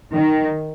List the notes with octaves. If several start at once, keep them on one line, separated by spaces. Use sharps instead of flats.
D#3